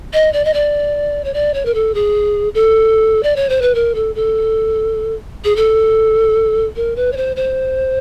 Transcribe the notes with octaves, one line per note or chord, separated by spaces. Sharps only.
D#5
D5
D#5
D5
C#5
D5
C#5
A#4
A4
G#4
A4
D5
C#5
C5
B4
A#4
A4
A4
G#4
A4
A#4
B4
C#5
C5
C5